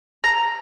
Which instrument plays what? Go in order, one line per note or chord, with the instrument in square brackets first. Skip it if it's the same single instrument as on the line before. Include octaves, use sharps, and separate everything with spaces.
[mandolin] A#5